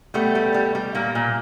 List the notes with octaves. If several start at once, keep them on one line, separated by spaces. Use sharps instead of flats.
G3 A3 B3
G3
G3
G3
A#2 A#3
A#2